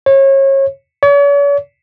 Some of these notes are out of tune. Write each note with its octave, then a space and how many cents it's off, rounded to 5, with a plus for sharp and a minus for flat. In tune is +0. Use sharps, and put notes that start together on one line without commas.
C#5 -30
C#5 +45